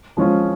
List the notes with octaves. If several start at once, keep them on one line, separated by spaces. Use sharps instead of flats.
F3 G#3 C#4 F4